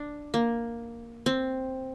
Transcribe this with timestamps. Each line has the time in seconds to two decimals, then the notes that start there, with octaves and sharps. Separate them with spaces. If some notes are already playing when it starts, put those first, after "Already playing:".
Already playing: D4
0.34 A#3
1.26 C4